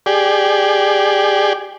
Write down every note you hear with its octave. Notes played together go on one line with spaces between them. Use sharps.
G4 G#4 D5